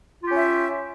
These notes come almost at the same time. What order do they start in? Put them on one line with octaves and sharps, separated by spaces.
F4 G4 C#4 E5